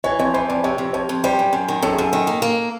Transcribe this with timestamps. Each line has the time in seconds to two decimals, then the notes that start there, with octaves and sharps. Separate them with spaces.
0.04 E3 C#5
0.19 F2 C#5
0.34 E3 C5
0.49 F2 D5
0.64 C3 C#5
0.78 F2
0.93 F2 C#5
1.09 F2
1.24 G3 C5
1.39 F#2
1.53 F#2
1.68 D#3
1.82 F#2 A4
1.91 G#4
1.98 F#2 A4
2.13 D#3
2.27 A#3
2.42 A#3